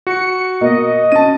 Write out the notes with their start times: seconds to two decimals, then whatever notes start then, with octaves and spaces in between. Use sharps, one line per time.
0.07 F#4 C#7
0.61 B2 A#3 D#5
1.12 C#4 A5 D#7